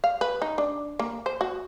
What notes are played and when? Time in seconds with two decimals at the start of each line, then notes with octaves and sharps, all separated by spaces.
0.04 F5
0.21 B4
0.42 D#4
0.58 D4
0.99 A#3
1.26 C5
1.41 F#4